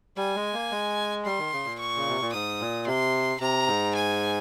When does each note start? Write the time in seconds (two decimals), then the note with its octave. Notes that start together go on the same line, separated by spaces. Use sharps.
0.17 G3 G#5
0.36 G#3
0.53 A#3
0.71 G#3
1.25 G3 C6
1.39 D#3
1.53 C#3
1.65 A#2
1.79 C#6
1.96 C#3
2.09 C3
2.21 A#2
2.33 G#2 D#6
2.60 A#2
2.86 C3 C6
3.41 C3 A#5
3.68 G#2
3.95 G#5